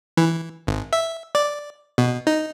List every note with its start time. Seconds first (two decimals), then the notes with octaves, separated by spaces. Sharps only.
0.17 E3
0.67 G#1
0.93 E5
1.35 D5
1.98 B2
2.27 D#4